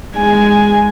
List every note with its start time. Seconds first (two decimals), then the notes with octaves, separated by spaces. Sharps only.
0.16 G#3 G#5